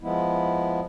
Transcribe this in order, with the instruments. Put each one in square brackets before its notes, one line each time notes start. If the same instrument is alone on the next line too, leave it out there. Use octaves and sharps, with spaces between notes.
[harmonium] F3 G#3 B3 E4